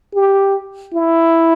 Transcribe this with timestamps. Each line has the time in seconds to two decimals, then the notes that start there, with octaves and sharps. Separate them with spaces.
0.15 G4
0.94 E4